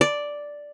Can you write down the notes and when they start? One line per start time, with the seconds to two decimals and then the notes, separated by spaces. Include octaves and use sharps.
0.01 D5